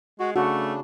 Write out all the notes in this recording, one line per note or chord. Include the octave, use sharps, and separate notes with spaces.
G#3 F#4
C#3 A3 D4 F#4